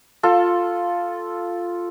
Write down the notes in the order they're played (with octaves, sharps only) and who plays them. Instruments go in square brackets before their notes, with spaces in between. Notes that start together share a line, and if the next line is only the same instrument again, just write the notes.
[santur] F4 A4